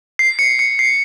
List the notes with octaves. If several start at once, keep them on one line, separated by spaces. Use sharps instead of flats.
C7
C#7
C#7
C7